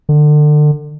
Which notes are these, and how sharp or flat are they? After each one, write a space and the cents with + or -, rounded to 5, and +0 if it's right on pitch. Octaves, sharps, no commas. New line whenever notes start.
D3 +30